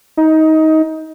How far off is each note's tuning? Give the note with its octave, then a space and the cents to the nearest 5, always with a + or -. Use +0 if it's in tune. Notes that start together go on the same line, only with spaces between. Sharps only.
D#4 +20